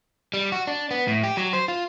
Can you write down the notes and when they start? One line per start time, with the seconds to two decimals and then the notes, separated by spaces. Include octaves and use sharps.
0.34 G3
0.52 F#4
0.67 D4
0.91 B3
1.07 A2
1.23 G4
1.37 F#3
1.53 C5
1.68 F4